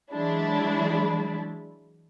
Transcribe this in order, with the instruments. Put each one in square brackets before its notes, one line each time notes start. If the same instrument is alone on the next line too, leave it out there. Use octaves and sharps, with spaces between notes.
[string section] E3 F#3 G#3 D4 E4